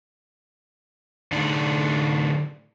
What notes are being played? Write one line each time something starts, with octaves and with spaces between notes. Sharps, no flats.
A2 D3 D4 D#4 D5